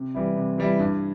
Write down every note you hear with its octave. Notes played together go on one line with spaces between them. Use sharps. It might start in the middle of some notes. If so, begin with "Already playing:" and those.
Already playing: C3
E3 G3 E4
C3
E3 G3 E4
G2